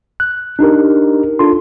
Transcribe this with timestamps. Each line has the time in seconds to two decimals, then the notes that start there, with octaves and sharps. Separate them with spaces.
0.20 F#6
0.59 D4 D#4 G4 A#4
1.39 D4 F4 A4 C6